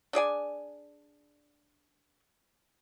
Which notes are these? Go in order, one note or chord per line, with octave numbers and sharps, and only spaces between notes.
D4 G#4 D5 G#5